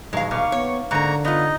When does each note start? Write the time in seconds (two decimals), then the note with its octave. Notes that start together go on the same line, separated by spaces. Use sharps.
0.13 D#1 G#3 F5 A#5 C#6
0.31 B2 F5 C#6 D6 F6
0.52 B3 C#5
0.91 G#2 D3 A#3 A#5 C#6
1.25 B3 D#4 F4 D#5